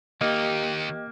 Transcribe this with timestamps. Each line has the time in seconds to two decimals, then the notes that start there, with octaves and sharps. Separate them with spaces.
0.21 D#2 A#3 D#4 G4 D#5